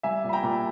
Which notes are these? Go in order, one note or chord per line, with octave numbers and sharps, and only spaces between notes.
G3 E5 G#5
A#2
B5
G5 A#5
A#2